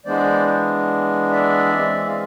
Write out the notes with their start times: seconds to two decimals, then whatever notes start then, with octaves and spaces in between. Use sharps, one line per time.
0.06 E3 G#3 B3 D4 C5 D5
1.32 D5 E5
1.74 E3 G#3 C4
2.07 F5